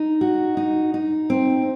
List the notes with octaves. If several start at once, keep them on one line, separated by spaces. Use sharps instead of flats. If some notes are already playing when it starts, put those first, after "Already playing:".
Already playing: D#4
F#4
D#4
D#4
C4